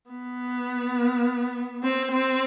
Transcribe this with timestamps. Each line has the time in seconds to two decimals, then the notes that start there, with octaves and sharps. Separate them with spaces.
0.10 B3
1.83 C4
2.12 C4